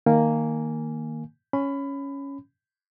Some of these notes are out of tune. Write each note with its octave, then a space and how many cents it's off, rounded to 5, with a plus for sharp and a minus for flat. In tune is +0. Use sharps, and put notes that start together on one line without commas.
D#3 +0 A#3 -10 G#5 +0
C#4 +0 B5 +20